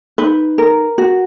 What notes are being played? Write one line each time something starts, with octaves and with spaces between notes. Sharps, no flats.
D#4 B4
A#4
F#4